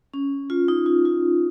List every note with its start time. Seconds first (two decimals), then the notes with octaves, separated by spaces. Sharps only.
0.14 C#4
0.50 F4
0.68 D#4
0.86 F4
1.05 F4